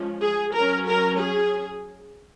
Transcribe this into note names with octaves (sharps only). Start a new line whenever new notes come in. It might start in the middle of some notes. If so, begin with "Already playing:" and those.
Already playing: F3 G#3 C#4
G#4
F#3 C#4 A#4
A#4
G#4